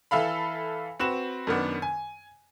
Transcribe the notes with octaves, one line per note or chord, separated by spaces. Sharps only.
E3 A4 E5 F5 B5
C4 F#4 B4 E7
F#2 D#3 B3 D4
G#5